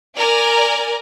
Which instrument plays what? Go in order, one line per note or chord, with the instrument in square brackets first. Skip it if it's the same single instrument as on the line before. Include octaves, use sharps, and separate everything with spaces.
[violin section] A#4 D5 G#5